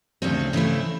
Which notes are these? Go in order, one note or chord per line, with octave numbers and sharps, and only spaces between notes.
D2 C#3 E3 A3 C4
C#3 E3 A3 C4 E4